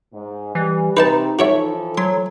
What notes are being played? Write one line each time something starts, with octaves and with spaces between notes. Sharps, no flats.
G#2
E3 G3
C3 D#4 B4 D#5 A5
E3 F3 F#4 A4 C#5 E5
F#3 C6